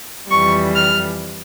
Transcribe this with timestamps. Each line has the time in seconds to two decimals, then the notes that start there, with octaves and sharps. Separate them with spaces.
0.29 F2 E3 G3 C#6
0.75 F6